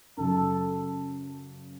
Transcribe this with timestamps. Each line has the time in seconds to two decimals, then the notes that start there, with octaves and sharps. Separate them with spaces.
0.17 F#2 C#3 F#3 A4